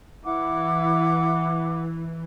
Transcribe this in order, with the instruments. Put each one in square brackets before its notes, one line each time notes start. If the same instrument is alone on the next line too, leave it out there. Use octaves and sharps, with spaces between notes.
[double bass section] E3 [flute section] E4 F#5 D6